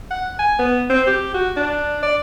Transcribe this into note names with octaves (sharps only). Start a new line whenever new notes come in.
F#5
G#5
B3
C4
G4
F#4
D4
D5